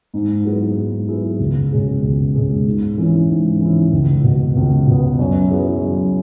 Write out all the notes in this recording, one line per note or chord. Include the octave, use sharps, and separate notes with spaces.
G#2
F#3 B3 E4 G#4
G#2
F#3 B3 E4 G#4
C#2
B2 G#3 C#4 G#4
C#2
B2 G#3 C#4 G#4
G#2
E3 C#4 E4
G#2
E3 C#4 E4
C#2
B2 B3
C#2
B2 B3
F#2
F#3 B3 E4 G#4
F#2